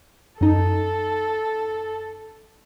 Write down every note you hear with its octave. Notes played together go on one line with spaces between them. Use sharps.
F#2 D#4 A4